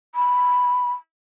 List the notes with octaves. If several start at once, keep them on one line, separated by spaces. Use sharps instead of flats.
B5